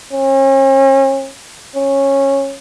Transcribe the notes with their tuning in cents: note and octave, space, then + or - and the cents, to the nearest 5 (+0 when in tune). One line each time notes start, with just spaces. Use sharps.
C#4 -40
C#4 -15